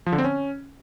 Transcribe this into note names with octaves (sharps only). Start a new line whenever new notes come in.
F3
D3
C4
C#4